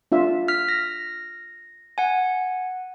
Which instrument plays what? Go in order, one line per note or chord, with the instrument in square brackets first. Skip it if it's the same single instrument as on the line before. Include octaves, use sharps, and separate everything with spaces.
[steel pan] D4 F4 E5
[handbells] F6 B6
A#6
F#5 G#5